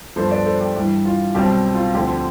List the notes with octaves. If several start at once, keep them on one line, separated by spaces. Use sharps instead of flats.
G2 F3 B3 D4 A4 C5
B4 D5
A4 C5
G4
G2 E3 G3 G4
F4
B1 B2 G3 C4 G4
F4
D2 D3 F3 C4 G4